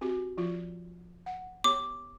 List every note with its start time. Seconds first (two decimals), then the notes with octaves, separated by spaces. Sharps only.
0.01 C4 F#4 G4
0.38 F3 F4
1.26 F#5
1.64 B3 G4 C#5 D6